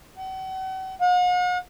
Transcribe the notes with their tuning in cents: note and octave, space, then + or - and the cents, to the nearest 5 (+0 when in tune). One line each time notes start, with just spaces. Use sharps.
F#5 +40
F#5 -45